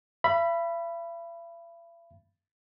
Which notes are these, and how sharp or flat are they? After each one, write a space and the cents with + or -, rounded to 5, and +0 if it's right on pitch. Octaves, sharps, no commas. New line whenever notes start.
E5 +45 B5 +0